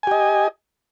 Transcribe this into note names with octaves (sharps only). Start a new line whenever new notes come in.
G4 D#5 G#5